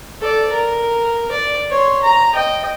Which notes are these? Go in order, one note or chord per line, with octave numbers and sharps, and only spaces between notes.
A4 D5
A#4
D5
C#5 C6
A#5
D#5 G5